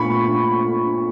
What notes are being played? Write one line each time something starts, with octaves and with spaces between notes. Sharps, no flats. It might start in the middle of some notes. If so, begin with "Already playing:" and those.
Already playing: A#2 A3 B5 C#6